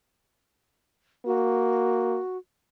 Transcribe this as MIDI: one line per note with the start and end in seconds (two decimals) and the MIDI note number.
1.26 2.19 58
1.26 2.38 66